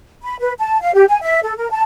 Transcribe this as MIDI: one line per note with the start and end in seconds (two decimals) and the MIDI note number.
0.23 0.36 83
0.40 0.52 71
0.59 0.81 81
0.81 0.94 77
0.95 1.05 67
1.09 1.19 80
1.22 1.39 76
1.43 1.56 69
1.57 1.71 70
1.71 1.82 81